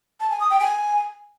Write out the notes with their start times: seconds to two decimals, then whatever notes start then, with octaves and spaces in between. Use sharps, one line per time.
0.20 A5
0.30 G#5
0.40 D#6
0.50 G5
0.60 G#5